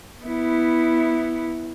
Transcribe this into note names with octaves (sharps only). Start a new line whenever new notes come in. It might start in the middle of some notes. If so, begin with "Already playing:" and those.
B3 E4